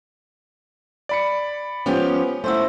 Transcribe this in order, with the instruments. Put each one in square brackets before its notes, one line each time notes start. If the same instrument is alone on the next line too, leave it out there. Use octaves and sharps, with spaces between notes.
[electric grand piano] D5 B5 C#7
[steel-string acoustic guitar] F3 C#4 G4 [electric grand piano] B3
[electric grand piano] A3 E6 [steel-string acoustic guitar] E4 F#4 C5